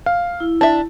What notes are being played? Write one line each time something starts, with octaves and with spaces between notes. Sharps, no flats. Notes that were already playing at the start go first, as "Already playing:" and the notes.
F5
E4
D4 E5 A5